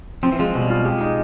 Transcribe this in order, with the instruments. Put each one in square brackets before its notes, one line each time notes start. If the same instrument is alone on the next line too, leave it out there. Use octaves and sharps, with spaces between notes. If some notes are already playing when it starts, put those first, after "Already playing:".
[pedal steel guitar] F3 [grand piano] C4
[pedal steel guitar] E3
[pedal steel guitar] F3 [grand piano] G#3
[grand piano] B2 [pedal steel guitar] G3
[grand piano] F4
[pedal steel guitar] G#3 [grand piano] G4
[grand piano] D#4